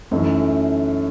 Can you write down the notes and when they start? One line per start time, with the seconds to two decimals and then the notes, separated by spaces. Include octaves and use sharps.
0.11 F#2 E3 A3 D#4